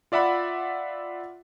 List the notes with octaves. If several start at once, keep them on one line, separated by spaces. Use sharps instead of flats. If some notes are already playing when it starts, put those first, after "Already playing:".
F4 D5 E5 F#5 B5